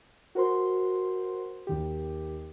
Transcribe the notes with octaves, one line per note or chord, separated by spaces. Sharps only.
F#4 A#4 C5 C6
D#2 D#3 G4